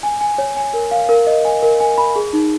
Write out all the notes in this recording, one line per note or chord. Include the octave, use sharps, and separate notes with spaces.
G#5
G#5
C#5
G#5
A#4
F5
A#4
D#5
G#5
A#4
G#5
B5
G#4
D#4